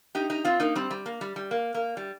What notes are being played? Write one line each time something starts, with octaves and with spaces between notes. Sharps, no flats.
D#4 G4
D#4 G4
C4 F4
A#3 D#4
G3 C4
G3
A#3
G3
G3
A#3
A#3
G3